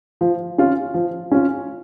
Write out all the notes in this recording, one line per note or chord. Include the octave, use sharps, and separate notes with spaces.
F3
C#4 F4
F3
C#4 F4